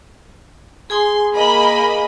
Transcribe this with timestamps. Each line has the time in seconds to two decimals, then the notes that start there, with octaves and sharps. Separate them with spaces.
0.90 G#4 G#5 C6 D#6
1.35 A#3 D#5 B5